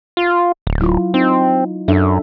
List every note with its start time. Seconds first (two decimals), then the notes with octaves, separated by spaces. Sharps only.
0.17 F4
0.67 D1
0.80 F#3 E4 F4
1.14 C4 D#4
1.88 F#2 D4 A4 E5